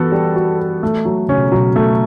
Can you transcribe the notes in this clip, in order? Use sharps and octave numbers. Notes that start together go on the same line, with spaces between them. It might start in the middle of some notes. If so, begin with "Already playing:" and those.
Already playing: E3 B3 F#4 A4
G3
F#4
A4
A3
F#3
C#3 C#4
B2
B2 F#3
A3